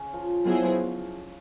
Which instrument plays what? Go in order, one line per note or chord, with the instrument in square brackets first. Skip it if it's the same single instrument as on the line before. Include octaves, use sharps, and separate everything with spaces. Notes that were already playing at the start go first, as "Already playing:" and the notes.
Already playing: [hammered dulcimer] C#3 C#4
F3 F4
[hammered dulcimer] F3 F4 [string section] F#3 B3 E4 G#4 C5